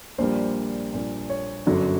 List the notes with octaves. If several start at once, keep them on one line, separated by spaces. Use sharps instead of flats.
A#1 A#2 G3 A#3 C5
A#1 A#2 G3 A#3
C#5
G1 F#2 D3 F#3